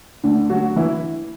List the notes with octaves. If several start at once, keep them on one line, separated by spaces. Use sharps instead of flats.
D2 D3 D4
D3 F#3 F#4
E3 E4